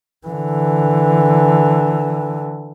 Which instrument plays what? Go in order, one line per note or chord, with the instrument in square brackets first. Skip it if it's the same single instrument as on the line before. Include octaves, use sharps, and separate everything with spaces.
[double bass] D3 E3